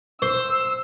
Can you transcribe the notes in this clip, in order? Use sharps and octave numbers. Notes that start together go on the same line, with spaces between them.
C5 E6